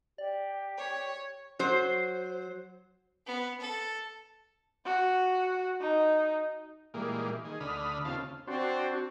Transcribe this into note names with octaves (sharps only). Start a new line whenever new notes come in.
G4 D5
C#5
F#3 C5
B3
A4
F#4
D#4
A#2 E3 G3 G#3 A#3
D#3 G#4
D2 D3 B5 D#6 F6
D#2 C#3 C4 F4 F5 A5
C4 D4 F#4 C5